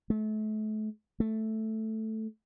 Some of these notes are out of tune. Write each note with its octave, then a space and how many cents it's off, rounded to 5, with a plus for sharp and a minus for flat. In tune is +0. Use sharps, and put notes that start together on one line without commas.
A3 -35
A3 +0